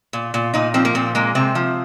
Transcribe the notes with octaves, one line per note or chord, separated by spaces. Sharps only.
A#2
A#2
A#2 D#4
F3 C4
A#3
A#2 C4
G#3 A#3
C3 C4
F3